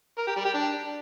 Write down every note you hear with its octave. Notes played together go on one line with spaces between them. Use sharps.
A#4
G4
G3
G4
D4